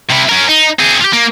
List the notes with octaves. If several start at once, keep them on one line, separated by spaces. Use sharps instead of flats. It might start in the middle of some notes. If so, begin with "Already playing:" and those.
C3 E4
C#4 A#4
D#4
C4 G#4
F4 G4
A#3